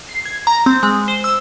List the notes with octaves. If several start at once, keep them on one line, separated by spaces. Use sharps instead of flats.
C7
G#6
A#5
C4
G#3
C5
E6